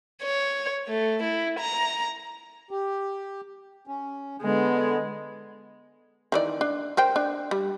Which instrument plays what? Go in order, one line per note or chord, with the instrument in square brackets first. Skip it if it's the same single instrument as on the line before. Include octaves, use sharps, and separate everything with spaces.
[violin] C#5
A3
E4
A#5
[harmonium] G4
C#4
[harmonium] D3 B3 [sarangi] G#3
[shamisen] D#3 E3 D5
D4
A#4 C5 G5
D4
G3